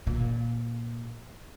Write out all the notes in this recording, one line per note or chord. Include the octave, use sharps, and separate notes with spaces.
A#2